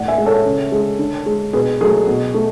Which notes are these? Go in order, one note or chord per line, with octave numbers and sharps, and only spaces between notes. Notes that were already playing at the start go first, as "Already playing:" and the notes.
Already playing: A2 D5 F#5
E5 G#5
G#3
A4 C#5
C#3
G#3
D3
G#3
B2 G#4 B4
F#3 A3 G#4
B2
A3